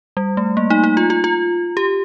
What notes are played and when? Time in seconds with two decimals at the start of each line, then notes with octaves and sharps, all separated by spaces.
0.17 G3
0.37 A3
0.57 A#3
0.70 D#4
0.84 D#4
0.97 F4
1.10 F4
1.24 F4
1.77 G4